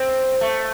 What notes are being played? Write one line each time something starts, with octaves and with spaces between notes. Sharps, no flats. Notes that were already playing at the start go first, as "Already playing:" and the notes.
Already playing: C4
A3